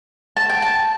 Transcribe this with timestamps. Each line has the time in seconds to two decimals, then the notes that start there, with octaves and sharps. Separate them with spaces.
0.37 A5
0.49 G5
0.62 A5